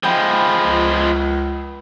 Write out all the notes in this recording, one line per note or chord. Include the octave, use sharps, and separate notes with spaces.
F3 G#3 F#5 G5 B5
C#2